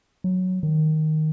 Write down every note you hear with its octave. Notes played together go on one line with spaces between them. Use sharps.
F#3
D#3